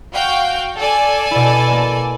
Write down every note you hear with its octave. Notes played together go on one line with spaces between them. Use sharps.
F#4 F5 G5
A4 D5 G#5
B2 E4
A#3